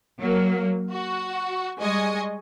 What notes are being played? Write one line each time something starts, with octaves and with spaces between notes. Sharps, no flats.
F#3 A#3
F#4
G3 G#3 D#5 G#5 C#6